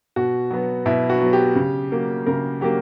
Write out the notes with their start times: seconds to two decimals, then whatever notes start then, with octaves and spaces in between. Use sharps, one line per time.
0.16 B2 F#4
0.51 F#3 B3
0.86 B2 E4
1.10 F#4
1.20 F#3 B3
1.33 G4
1.56 C#3
1.92 F#3 A#3
2.26 C#3 A#4
2.61 F#3 A#3 G4